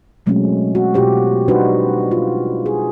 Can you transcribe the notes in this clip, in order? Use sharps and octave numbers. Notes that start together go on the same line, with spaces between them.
B2 F#3 G#3 A3 C4 C#4
F#4
B2 F4 G4 C5
G3 D4 D#4 F#4 B4 C5
F4
G#4